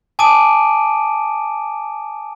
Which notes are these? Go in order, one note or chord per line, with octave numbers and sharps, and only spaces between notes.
G#5 A5 D6 D#6 D7 D#7